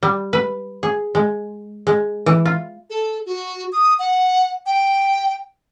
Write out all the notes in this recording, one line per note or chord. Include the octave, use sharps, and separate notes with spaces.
G3
B4
G#4
G#3
G#3
E3
F4
A4
F#4
D#6
F#5
G5